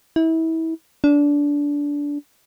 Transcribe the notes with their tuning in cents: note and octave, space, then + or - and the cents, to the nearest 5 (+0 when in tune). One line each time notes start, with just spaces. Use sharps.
E4 -30
D4 -20